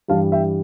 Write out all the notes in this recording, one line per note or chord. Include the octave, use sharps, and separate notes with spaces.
G2 E3 G3 F5 A5
E5 G5